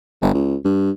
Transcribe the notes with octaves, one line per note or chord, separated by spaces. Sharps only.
G1
C#2
G2